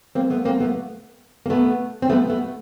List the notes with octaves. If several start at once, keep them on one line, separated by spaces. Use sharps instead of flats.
A#3 C4
A3 B3
A#3 C4
A3 B3
A#3
A3 B3
C4
A3 B3
A3 B3